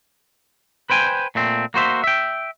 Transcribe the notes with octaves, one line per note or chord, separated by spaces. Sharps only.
B4 C5 G5 G#5
A#2 A3 C4
A#3 F#4 C5 E5
E5 G5